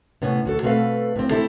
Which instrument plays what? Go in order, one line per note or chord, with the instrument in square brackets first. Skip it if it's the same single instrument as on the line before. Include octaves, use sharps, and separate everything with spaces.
[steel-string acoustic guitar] A2 C3 B3 C#4
D2 F#4 A4
B2 A3 C4 A4 B4 F5
A2 C4
A3 C4 E4 G4 A4